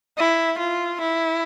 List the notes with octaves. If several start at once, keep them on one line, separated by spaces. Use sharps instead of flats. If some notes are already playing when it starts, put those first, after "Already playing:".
E4
F4
E4